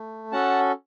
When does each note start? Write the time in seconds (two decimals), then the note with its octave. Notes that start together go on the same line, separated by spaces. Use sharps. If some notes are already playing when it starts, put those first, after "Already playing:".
Already playing: A3
0.32 C#4 F#4 A4 F#5 A5